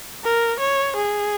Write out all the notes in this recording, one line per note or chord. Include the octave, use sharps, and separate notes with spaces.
A#4
C#5
G#4